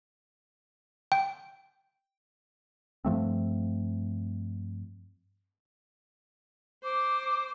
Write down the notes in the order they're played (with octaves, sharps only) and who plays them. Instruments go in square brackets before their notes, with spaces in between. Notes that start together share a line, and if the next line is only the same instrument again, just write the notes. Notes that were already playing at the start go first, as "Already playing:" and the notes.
[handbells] G5
[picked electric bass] G2 F3 A3 C4
[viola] C5 [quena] D6